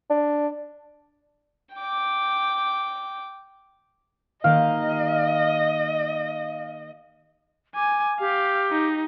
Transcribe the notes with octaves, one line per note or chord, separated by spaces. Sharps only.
D4
G5 D6
D#3 A#3 G4 D#5 F5
G#5 D6
G4 F5
D#4